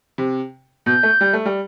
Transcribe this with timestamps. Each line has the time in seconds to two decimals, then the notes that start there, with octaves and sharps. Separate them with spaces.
0.18 C3
0.86 B2 G6
1.03 A3
1.21 G3
1.33 A3
1.45 G3